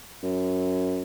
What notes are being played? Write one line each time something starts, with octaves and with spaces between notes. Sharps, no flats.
F#2